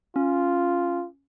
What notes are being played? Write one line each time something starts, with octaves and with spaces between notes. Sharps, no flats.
C#4 F4